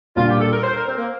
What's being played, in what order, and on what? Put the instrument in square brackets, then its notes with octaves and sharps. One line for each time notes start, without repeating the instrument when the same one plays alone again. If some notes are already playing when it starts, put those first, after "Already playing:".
[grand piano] A#2 G3 D4 [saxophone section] F4
[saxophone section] G4
A4
A#4
C5
A#4
C4
A#3